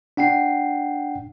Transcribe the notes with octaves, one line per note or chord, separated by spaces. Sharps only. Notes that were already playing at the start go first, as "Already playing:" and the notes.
D4 F#5 G5 C7